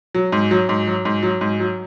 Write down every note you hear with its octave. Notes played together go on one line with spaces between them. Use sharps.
F#3
G#2
F#3
G#2
F#3
G#2
F#3
G#2
F#3